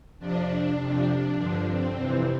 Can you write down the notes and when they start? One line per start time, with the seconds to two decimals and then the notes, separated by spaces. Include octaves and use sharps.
0.19 F2 C3 F3 D4
0.78 F2 C3 F3 D4
1.36 G2 D3 F3
1.66 C4
1.96 F2 C3 E3